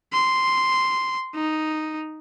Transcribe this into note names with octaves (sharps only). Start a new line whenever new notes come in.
C6
D#4